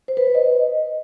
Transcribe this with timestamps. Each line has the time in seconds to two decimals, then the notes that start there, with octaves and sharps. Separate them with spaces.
0.08 C5
0.17 B4
0.26 C#5
0.35 D#5